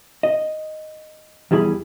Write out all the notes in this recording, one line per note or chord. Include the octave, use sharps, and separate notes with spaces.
D#5
E2 G3 E4 G#4 B5